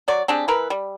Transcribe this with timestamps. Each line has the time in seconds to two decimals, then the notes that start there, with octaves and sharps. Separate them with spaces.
0.08 F#3 D5 C#6
0.28 C4 D4 G4 G#4
0.48 E3 A#4 B4
0.70 G3